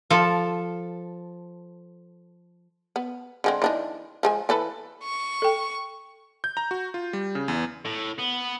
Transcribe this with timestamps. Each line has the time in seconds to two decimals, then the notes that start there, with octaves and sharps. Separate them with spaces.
0.10 F3 A4
2.96 B3
3.44 D3 G#3 C4
3.62 E3 D4 D#4
4.23 F3 G#3 G#5
4.49 E3 A4 B4
5.04 C#6
5.42 A4 G5
6.44 G6
6.57 A#5
6.71 F#4
6.94 F4
7.13 G3
7.35 C#3
7.48 E2
7.86 A2
8.19 B3